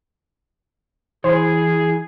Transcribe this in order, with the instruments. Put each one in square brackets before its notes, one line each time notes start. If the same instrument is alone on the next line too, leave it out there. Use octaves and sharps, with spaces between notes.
[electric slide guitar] E3 [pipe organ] G#4 [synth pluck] C5